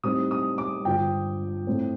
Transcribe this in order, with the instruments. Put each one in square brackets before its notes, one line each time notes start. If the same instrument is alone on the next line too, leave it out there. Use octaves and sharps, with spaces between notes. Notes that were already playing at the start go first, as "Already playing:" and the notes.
[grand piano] A2 G3 C4 D#4 D#6
D#6
D6
G2 D3 F3 G5
A2 A3 C4